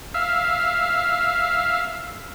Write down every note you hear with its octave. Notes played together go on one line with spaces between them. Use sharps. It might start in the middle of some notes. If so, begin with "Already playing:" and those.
E5 F5